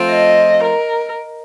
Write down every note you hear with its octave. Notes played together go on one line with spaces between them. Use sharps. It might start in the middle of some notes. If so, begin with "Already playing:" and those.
Already playing: F3 A3 C4 F4
D#5
A#4